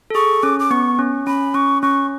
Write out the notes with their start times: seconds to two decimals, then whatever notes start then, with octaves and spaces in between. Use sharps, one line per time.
0.10 A4
0.15 G#4 C#6
0.43 C#4 D6
0.60 D6
0.71 B3 C#6
0.99 C#4
1.27 C#4 B5
1.54 C#4 C#6
1.82 C#4 C#6